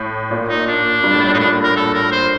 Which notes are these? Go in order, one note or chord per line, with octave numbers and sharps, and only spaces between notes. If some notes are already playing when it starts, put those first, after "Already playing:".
Already playing: A2
A#2
D#4
D4
G2
A2
A#2
D#4
A2 D4
A#4
A4
A#4
C5